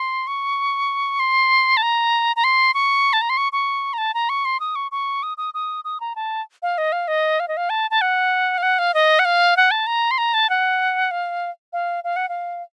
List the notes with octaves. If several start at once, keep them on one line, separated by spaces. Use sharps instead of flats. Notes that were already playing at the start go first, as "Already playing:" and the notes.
Already playing: C6
C#6
C6
A5
A#5
A#5
C6
C#6
A5
A#5
C6
C#6
C#6
A#5
A5
A#5
C#6
C6
D#6
C#6
C#6
D#6
D#6
D#6
D#6
A#5
A5
F5
D#5
F5
D#5
F5
D#5
F5
A5
A5
F#5
F5
F#5
F5
D#5
F#5
F5
F#5
A5
A#5
C6
A#5
A5
F#5
F5
F5
F5
F#5
F5